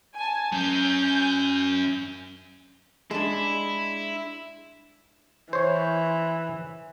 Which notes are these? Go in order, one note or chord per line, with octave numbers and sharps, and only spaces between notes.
G#5 A5
F#3 C#4 G#5 G6
G#3 D4 E4
E3 C5 C#5